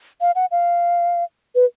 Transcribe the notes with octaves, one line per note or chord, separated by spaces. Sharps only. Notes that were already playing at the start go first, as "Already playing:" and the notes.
F5
F#5
F5
B4